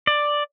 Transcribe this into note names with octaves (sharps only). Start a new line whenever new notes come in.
D5